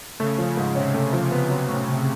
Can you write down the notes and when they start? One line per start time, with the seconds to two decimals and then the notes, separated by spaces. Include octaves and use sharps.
0.19 C#3 A3
0.38 F3
0.57 G#2
0.75 C3 C#4
0.94 A3
1.13 F3
1.31 B3
1.50 F#3
1.69 A2
1.87 A2